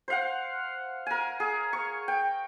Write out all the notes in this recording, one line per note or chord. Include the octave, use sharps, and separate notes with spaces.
C5 F5 F#5
A#4 G#5
G#4
C#6
G5